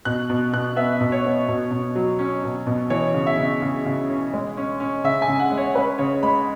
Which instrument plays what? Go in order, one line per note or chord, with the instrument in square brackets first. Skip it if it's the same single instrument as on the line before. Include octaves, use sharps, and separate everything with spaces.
[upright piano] B2 F#6
B2
B2 F#6
B3 E5
B2
C#5
B3
B2
B2
F#3
C#4
B2
B2
E3 C#5
C#3
E5
C#3
C#3
C#3
C#4
G#3
C#4
C#4
C#3 E5
G#5
C#3
F#5
G#3
C#5
C#4 B4
C#3 C#5
G#3 B5